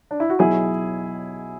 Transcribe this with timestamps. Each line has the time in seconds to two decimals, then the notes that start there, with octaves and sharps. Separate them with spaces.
0.11 D4
0.20 E4
0.30 F#4
0.39 B1 B2 F#3 E4 G#4